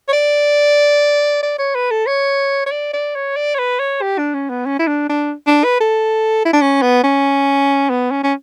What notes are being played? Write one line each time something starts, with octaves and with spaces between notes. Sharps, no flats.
C#5
D5
D5
C#5
B4
A4
C#5
C#5
D5
D5
C#5
D5
C#5
B4
C#5
G4
D4
C#4
B3
C#4
E4
D4
D4
D4
B4
A4
E4
D4
C#4
B3
C#4
B3
C#4
C#4